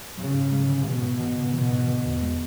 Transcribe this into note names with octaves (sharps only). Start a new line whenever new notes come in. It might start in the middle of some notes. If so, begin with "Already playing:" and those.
C#3 F#3
G#2
G#3
D3
B2 E3
G#2
E3
C#3
B2 E3
G#2
D3
E2
G#3